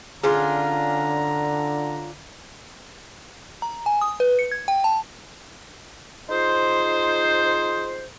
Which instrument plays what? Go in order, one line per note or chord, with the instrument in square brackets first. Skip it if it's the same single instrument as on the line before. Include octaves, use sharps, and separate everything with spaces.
[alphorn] D3 [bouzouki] C#4 D4 F4 [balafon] G#4 [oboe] A#5
[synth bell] A#5
G#5
D#6
B4
C#7
G#6
G5
A5
[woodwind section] D#4 F4 G#4 C5